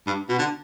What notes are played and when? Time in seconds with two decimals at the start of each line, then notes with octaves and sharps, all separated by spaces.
0.07 G2
0.29 B2
0.39 D3